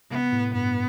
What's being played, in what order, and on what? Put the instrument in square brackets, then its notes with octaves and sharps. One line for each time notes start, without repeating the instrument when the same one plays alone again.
[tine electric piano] C3 [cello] B3
[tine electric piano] A2
[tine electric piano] G2 [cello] B3